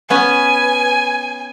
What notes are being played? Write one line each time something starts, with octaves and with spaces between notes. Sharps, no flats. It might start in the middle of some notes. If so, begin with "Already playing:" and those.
B3 C#4 B4 G#5